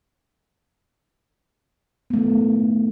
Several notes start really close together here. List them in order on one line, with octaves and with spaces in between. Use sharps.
B3 A3 D#3